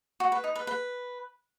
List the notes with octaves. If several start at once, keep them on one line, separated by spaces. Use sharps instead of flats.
F#4
B4
D#4
B4
B4